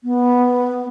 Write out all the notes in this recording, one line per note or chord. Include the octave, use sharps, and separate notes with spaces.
B3